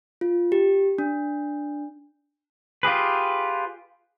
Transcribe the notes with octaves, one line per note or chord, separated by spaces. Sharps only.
F4
G4
D4
F4 G4 G#4 B4